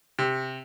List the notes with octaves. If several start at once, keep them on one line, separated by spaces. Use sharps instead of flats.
C3